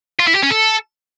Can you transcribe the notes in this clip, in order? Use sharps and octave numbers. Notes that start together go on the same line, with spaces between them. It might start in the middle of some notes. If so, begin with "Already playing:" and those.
F4
E4
G4
C#4
A4